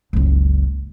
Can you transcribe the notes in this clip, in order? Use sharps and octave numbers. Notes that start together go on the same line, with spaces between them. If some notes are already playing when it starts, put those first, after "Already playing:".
F#1 C#2